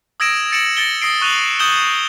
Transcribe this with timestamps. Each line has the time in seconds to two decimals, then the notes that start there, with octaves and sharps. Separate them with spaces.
0.20 D#6 E6 G#6 A#6 D7 E7
0.51 G#6 A6 C#7 D7 E7 F#7
0.77 A6 A#6 C#7 D7 G7
1.01 D#6 A#6 C7 D7
1.21 C#6 F#6 D#7 F7 F#7
1.59 D#6 G6 C#7 E7 F#7 G7